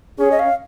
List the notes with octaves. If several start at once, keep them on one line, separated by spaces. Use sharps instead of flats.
C#4 G#4
D#5
F5